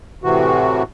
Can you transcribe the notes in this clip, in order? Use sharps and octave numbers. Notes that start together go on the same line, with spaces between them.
A2 C3 E3 F#4